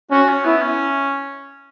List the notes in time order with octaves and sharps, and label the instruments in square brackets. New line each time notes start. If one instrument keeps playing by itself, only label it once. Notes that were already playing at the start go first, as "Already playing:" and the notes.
[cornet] C#4 [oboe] F#4
[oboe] C#4
[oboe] B3 [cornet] E4
[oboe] C#4